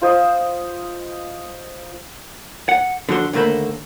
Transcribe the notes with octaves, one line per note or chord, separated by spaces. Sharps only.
F4 C5 D#5
F#5
D3 F3 F#4 C6
D#2 D3 A3 A#3 C5 B5